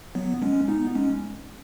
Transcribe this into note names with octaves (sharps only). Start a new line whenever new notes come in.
F#3 B3
G#3 C#4
B3 D#4
G#3 C#4